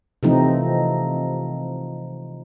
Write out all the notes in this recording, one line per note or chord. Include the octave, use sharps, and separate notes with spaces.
C3 E3 F3 A3 C4 D#4